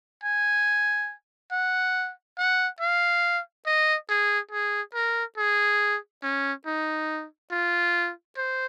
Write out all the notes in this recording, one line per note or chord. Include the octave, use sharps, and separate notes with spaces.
G#5
F#5
F#5
F5
D#5
G#4
G#4
A#4
G#4
C#4
D#4
F4
C5